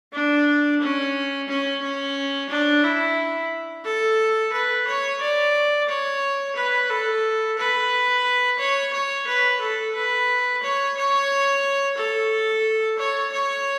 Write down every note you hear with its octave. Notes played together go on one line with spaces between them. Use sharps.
D4
C#4
C#4
C#4
D4
E4
A4
B4
C#5
D5
C#5
B4
A4
B4
C#5
C#5
B4
A4
B4
C#5
C#5
A4
C#5
C#5